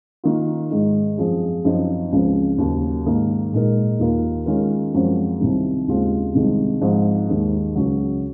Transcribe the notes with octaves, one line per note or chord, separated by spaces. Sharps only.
D#3 A#3 F4
G#2 D#3 G#3 D#4
F#2 F3 C4 F4 G#4
F#2 F3 C4 D#4
C#2 C#3 F3 C4
D#2 C#3 F#3 A#3
G#2 D#3 A#3
A#2 G#3 D#4 A#4
D#2 D#3 A#3 F4 A#4
D#3 G#3 C#4 F4 A#4
F#2 F3 G#3 C4 F#4
C2 C3 D#3
D#2 C#3 G#3 C4 F4
C2 C3 D#3 G#3
G#2 F3 C4 F4
D#2 D#3 G#3
C#2 C#3 F#3